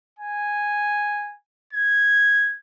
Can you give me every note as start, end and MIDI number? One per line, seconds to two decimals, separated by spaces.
0.19 1.35 80
1.73 2.56 92